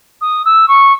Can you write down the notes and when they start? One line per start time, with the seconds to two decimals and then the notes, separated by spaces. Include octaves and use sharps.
0.21 D#6
0.45 E6
0.68 C#6